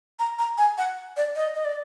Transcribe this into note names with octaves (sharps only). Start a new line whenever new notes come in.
A#5
A#5
G#5
F#5
D5
D#5
D#5
D5